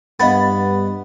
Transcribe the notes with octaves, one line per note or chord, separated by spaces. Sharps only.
G2 B3 D#5 F5 A6